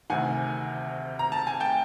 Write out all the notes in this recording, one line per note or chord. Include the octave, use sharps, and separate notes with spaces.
D2 C3 D#3 F#5 G#5
A#5
A5
G#5
G5 A5